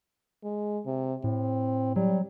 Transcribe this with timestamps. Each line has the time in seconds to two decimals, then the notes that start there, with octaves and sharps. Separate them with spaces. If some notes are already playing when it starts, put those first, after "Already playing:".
0.43 G#3
0.86 C3
1.24 A2 C4
1.96 F#3 G3